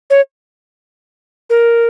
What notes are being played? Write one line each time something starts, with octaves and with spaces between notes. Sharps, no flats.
C#5
A#4